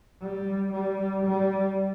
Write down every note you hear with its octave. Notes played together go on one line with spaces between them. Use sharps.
G3
G3
G3